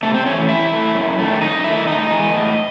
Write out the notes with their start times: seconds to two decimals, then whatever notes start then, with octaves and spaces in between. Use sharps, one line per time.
0.03 C3 A3 A4
0.14 C4 C5
0.26 E3 A3 C#4 C#5
0.49 C3 E4 E5
0.72 E3 A3
0.95 F#2
1.18 D#3 A3
1.41 F#2 D#4 D#5
1.64 D#3 A3 E4 E5
1.87 A2 D#4 D#5
2.11 E3 G#3
2.34 A2